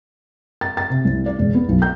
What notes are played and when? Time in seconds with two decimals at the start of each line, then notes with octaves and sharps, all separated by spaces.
0.61 A6
0.77 A6
0.90 C3
1.05 C2
1.26 D5
1.39 E1
1.54 B3
1.69 B1
1.82 G6